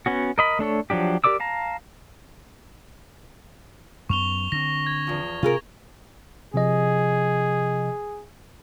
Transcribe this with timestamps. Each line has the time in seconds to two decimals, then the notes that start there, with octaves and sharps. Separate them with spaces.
0.06 B3 C#4 F#4
0.38 A#4 D#5 B5
0.59 A3 D4 A4 C#5
0.90 F3 F#3 D4 G4
1.24 G4 A#4 D5 D6 E6
1.40 F5 A5 A#5
4.09 F#2 B3 C#6 F7 G7
4.52 D3 C4 A#6
4.86 G#6
5.07 E2 F3
5.43 C3 F4 G#4 A#4
6.54 C3 F3 G#4 D#5